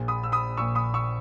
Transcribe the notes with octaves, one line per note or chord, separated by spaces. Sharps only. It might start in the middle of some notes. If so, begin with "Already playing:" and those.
Already playing: A#1 A#2
B5 D#6
E6
B5 D#6
A#1 A#2 C#6 E6
B5 D#6
C#6 E6